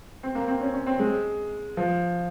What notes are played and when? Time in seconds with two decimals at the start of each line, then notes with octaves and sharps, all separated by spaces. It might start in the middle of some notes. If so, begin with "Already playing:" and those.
0.23 C4
0.35 A#3
0.48 C4
0.61 C#4
0.74 C#4
0.87 C4
0.99 G#3
1.77 F3